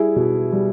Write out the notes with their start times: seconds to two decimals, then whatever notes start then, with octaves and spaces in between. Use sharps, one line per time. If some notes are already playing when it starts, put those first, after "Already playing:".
Already playing: G3 E4 G#4
0.16 B2
0.52 G3